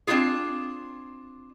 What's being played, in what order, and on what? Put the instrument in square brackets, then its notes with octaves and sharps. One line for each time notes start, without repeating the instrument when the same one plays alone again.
[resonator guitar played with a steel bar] C4 D4 E4 F4 G#4